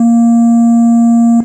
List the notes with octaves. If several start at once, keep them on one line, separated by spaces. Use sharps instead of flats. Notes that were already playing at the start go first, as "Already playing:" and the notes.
Already playing: A#3